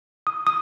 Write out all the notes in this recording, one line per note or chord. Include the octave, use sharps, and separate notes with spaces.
D#6
D#6